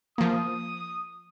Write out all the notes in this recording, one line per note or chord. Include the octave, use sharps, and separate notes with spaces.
F3 A#3 D#6